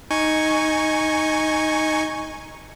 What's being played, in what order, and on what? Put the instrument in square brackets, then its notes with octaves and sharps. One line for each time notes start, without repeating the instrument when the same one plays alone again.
[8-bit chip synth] D#4 G#5 C#6